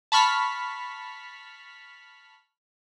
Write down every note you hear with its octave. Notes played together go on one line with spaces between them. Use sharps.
A5 B5 C#6 F6 B6